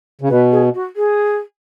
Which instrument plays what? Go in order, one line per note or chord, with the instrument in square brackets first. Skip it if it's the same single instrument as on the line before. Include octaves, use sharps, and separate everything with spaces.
[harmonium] C#3
[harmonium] B2 [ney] B4
[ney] G#4
F#4
G#4